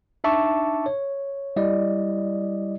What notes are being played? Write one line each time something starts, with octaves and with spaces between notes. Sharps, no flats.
D4 D#4 E5 A5 C#6 D6
C#5
G3 E4 D5 D#5